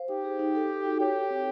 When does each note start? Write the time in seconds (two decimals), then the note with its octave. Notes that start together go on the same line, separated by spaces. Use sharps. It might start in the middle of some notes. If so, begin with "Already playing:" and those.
Already playing: C5 F5
0.09 D#4 G4
0.25 G#4
0.39 D#4
0.55 A4
0.70 D#4
0.85 F#4
1.00 G4 C#5
1.15 A4
1.30 C4